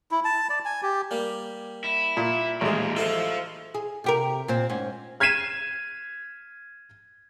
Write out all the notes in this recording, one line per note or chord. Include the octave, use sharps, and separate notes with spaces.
E4
A5
D5
G#5
G4
G3 A#3 G4
E4
A#2
A1 D#2 A#2 G#3
E4 F4 A4 C5 F5
G#4
C3 G4 A#4
A#2 C4
G#2 C#4
F6 G#6 B6 C7 D#7 E7